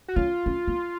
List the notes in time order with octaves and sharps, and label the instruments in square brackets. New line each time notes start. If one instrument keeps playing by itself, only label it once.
[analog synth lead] F#4
[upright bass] C#4 [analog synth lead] F4
[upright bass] C#4
B3